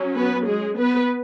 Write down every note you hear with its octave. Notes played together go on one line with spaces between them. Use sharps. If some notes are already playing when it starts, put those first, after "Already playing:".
Already playing: F#3 C#4
B3 B4
G#3 G#4
B3 B4